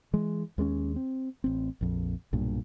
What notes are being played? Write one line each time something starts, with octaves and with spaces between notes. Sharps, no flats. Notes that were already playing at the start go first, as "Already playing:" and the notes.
E3 G#3
D#2 G#3 A3 C#4
C4
A1 C4
A#1 F2
B1 G2 A#2